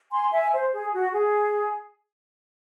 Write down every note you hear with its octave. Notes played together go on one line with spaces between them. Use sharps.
G#5 C6
E5 G#5
C5
G#4
F#4
G#4